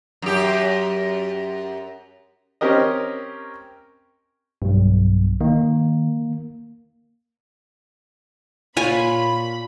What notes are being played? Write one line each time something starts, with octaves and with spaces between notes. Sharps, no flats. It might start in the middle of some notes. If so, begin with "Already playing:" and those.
F#2 G4
C4 C#4 G4 A#4 D#5
B1 G2
D#3 A#3
A#2 F4 C#5 G#5 B5